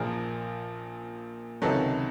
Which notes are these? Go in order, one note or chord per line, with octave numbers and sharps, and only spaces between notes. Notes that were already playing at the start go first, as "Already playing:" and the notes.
Already playing: A#1 A#2 F3 G#4 A#4
C#2 C3 D#3 F#3 A4 B4